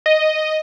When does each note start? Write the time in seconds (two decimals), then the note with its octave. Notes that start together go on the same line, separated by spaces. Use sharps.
0.06 D#5